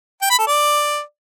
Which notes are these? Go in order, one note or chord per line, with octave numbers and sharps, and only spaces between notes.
G5
B5
A4
D5